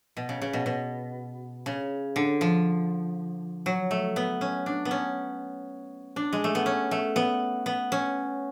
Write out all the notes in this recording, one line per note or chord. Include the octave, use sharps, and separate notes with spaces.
B2
C#3
C#3
B2
B2
C#3
D3
F3
F#3
A3
B3
C#4
D4
B3
C#4
D4
G#3
A3
B3
C#4
A3
B3
B3
C#4